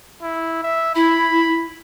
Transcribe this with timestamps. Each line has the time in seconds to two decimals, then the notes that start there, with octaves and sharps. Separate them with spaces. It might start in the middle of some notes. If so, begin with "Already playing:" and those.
0.22 E4
0.63 E5
0.95 E4 B5